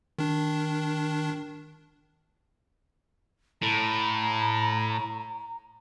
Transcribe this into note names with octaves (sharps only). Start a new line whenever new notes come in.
D#3 D4
A2 A#5